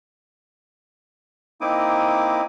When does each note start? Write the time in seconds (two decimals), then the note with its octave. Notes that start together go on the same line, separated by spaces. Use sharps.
1.61 A#3 C4 D#4 E4 D6 D#6